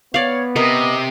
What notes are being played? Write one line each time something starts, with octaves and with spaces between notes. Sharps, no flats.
B3 C#5 D5 F5
C3 A#4 D#5